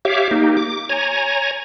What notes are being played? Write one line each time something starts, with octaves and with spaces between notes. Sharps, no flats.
G4 C#5 E5 F5 D6
A#3 D#4 G4
D6
C#5 G#5 A#5